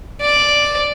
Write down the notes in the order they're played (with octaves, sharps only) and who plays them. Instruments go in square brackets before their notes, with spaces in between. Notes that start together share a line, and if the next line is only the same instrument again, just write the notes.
[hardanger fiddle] D5